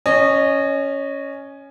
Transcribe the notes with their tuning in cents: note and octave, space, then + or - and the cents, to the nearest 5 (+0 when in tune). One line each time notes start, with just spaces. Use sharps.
C#4 +0 D#5 -25